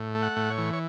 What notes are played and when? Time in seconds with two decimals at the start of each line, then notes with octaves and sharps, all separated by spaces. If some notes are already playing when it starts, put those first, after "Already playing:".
Already playing: A2
0.15 A3
0.22 F#5
0.36 A2
0.50 C#5
0.58 E3
0.73 C#5